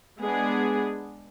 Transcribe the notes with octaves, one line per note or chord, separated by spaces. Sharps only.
G#3 B3 D4 G#4